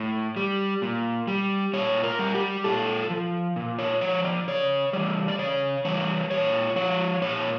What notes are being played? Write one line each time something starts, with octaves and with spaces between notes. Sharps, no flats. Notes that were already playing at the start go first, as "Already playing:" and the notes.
Already playing: A2
G3
A#2
G3
A#2 C#5
A#4
G3
G4
A#2 A4
F3
A#2
C#5
F3 C#5
D5
C#3 C#5
E3 G3 D5
D5
C#3 C#5
E3 G3 C#5
A#2 C#5
F3 C#5
A#2 C#5